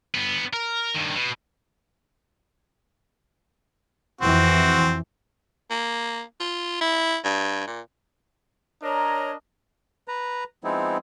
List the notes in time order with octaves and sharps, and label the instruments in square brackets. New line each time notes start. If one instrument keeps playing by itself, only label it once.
[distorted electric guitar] G2 B3
A#4
G2 D#3
B2
[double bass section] F2 E3 [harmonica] C4 F#4
[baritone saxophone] A#3
F4
E4
G2
A#2
[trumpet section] D4 A#4 D#5 [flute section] C#5 A#5
[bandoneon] B4 A#5
F3 G#3 B3 C4 D#4 E4